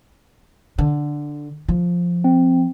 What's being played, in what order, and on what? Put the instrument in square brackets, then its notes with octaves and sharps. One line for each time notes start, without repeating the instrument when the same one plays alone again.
[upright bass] D3
F3
[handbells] C4